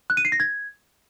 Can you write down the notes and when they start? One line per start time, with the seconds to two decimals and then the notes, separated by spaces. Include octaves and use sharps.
0.10 F#6
0.17 D#7
0.25 C7
0.32 A#6
0.40 G#6